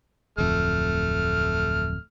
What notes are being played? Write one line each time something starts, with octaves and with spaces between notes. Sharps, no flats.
D1 F2 A3 F6